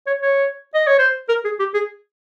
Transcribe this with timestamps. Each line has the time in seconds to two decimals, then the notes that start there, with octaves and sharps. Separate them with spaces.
0.07 C#5
0.22 C#5
0.74 D#5
0.87 C#5
0.99 C5
1.29 A#4
1.45 G#4
1.59 G4
1.74 G#4